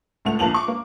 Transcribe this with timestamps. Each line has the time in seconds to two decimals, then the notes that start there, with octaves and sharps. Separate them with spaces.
0.25 C#2 A2 A3 F#5 F7
0.39 A#1 A#3 A5 F7 F#7
0.54 C#6 D6
0.68 A#3